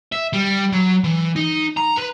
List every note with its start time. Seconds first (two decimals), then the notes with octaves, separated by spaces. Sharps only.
0.12 E5
0.33 G3
0.73 F#3
1.04 E3
1.36 D#4
1.77 A#5
1.97 B4